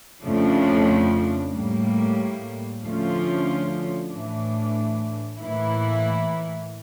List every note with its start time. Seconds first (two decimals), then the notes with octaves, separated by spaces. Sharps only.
0.23 F2 C#3 F3 A3 D4
1.52 A2 G3 A#3
2.81 D2 D3 F3 C#4 F4
4.11 A2 E3 A3 D4
5.39 A2 E3 A#3 E4